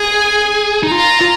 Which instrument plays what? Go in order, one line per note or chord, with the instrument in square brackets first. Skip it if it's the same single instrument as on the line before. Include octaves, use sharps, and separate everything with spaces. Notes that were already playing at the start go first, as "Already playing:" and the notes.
Already playing: [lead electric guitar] G#4 [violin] G#5
[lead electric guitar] D#4
[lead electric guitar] F4 [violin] A#5
[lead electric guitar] F4